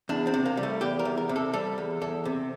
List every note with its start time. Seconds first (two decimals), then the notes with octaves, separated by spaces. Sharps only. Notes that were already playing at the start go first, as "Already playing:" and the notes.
0.09 E2 D4
0.27 C4
0.34 C3
0.46 A#3
0.57 G3
0.63 A3
0.81 E2 G4
0.99 A#4
1.05 E2
1.18 A#4
1.29 C3
1.36 A4
1.53 G3 A4
1.78 E2
2.01 E2 A4
2.25 C3